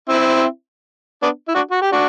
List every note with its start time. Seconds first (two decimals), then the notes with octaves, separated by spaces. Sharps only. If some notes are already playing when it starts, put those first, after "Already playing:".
0.09 C4 E4
1.23 B3 D4
1.48 E4
1.55 D4 F#4
1.71 F#4
1.82 G4
1.92 D4 F#4